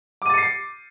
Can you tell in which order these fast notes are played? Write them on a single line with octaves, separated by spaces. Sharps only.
D6 D#7 A6 C#7 C7